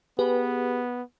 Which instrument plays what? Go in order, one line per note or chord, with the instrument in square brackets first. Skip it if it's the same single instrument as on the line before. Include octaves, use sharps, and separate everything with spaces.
[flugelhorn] B3 [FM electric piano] G4 G#4 B4